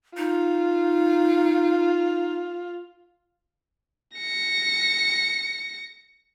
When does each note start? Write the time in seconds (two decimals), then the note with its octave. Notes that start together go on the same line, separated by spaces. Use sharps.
0.17 D#4 F4
4.17 A#6 C#7